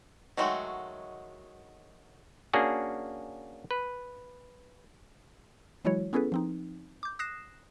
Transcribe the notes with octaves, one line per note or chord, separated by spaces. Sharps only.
D#3 F#3 G#3 A3 F#4
A#3 C#4 D4 F#4 G#4
B4
E3 F#3 G#3 E4 F#4 C#5
B3 C#4 E4 G#4 A4 B4
F3 C4 D#4
D6 G6
D#6 F#6 A#6 C7 E7